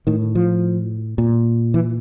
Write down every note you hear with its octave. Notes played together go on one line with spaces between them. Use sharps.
A2 D#3
F3
A#2
E3